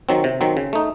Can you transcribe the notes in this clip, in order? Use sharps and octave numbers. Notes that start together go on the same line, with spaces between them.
D#3 F#3 C4
C3
D#3 F#3 C4
C#3
A3 D#4